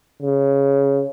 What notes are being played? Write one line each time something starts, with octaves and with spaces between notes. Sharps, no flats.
C#3